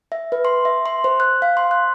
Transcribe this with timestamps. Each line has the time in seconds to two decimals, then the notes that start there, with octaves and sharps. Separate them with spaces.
0.12 E5
0.32 B4
0.45 C6
0.65 E5
0.86 C6
1.04 C5
1.20 F#6
1.42 F5
1.57 C6
1.71 F#6